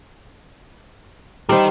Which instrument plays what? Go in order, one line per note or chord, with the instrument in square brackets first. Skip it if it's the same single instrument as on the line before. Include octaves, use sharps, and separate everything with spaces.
[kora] G3 C5 [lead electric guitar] D#4 A#4